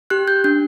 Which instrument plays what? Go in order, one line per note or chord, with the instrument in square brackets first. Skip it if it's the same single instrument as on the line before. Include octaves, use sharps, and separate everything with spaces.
[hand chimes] G4 F#6
G6
D4 G6